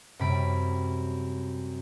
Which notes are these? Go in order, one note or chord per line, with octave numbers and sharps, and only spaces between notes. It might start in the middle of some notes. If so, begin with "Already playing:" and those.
F#2 C3 G3 B5 B6 D7